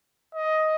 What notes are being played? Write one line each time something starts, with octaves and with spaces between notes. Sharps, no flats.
D#5